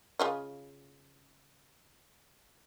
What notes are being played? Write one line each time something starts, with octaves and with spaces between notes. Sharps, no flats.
C#3 F4 D#5